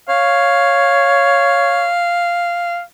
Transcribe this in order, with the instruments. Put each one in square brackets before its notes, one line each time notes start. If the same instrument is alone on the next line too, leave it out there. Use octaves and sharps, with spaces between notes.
[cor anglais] C#5 [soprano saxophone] F5